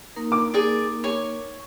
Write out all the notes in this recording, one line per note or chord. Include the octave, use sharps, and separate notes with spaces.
A#3 D#4 A#4
D6
G#4 D5
C#5 G#5